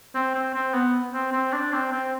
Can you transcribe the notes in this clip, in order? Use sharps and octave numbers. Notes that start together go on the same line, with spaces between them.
C4
C4
C4
B3
C4
C4
D4
C4
C4